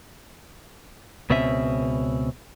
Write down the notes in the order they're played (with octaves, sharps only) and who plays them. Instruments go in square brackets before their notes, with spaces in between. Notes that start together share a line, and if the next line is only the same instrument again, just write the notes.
[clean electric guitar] C#2 B2 C4 C#4 E5